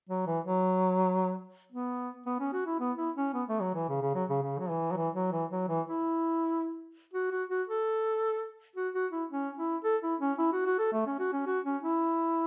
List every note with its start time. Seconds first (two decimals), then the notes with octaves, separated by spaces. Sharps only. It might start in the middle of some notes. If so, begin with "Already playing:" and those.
0.09 F#3
0.27 E3
0.44 F#3
1.72 B3
2.26 B3
2.40 C#4
2.53 F#4
2.66 E4
2.80 B3
2.97 E4
3.16 C#4
3.34 B3
3.48 A3
3.60 F#3
3.75 E3
3.89 C#3
4.01 C#3
4.15 F#3
4.29 C#3
4.42 C#3
4.59 F#3
4.69 E3
4.91 F#3
4.97 E3
5.15 F#3
5.32 E3
5.51 F#3
5.68 E3
5.86 E4
7.13 F#4
7.31 F#4
7.49 F#4
7.67 A4
8.76 F#4
8.94 F#4
9.11 E4
9.30 C#4
9.58 E4
9.84 A4
10.02 E4
10.20 C#4
10.38 E4
10.52 F#4
10.65 F#4
10.79 A4
10.93 A3
11.06 C#4
11.19 F#4
11.32 C#4
11.47 F#4
11.65 C#4
11.83 E4